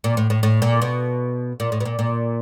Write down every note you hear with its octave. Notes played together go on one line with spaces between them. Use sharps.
A#2
A2
A2
A2
A#2
B2
A#2
A2
B2
A#2
A#2